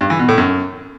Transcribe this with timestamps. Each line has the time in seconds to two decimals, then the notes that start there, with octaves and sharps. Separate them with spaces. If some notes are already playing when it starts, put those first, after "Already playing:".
0.01 G2
0.10 E3
0.19 B2
0.28 A2
0.38 F#2